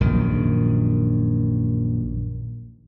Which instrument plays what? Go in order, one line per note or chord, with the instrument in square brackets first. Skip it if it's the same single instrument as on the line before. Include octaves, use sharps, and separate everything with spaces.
[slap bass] A#1 F#2 D#3